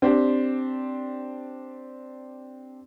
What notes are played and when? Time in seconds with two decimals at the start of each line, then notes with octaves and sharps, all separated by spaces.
0.02 C4 D4 G4